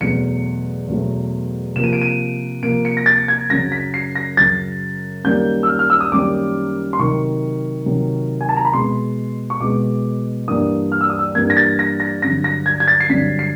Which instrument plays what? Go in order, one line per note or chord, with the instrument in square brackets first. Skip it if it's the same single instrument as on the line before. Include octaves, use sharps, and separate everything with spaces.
[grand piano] E2 B2 F#3 A3 C#7
E2 B2 F#3 A3
C3 F3 A#3 E7
D#7
D7
D#7
C3 F3 A#3 D7
C#7
A#6
A6
G#6
F#2 C#3 F#3 A#6
B6
C7
A#6
F#2 C#3 F#3 A6
F#2 D#3 G3 A#3 C#4 G6
E6
F6
F6
E6
D#6
F#2 D#3 G3 A#3 C#4 D6
C6
C3 D#3 F#3 C#6
C3 D#3 F#3
G#5
A5
A#5
B5
B2 G#3 B3 C6
C#6
B2 G#3 B3 D6
G2 E3 G3 A#3 D#6
F6
E6
D#6
E6
G2 E3 G3 A#3 G#6
A#6
A6
A#6
A#6
G2 D3 F#3 A#6
A#6
G#6
G#6
A6
C7
G2 D3 F#3 B6
C7